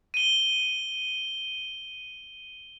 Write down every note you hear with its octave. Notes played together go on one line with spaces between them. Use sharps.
D#7 G7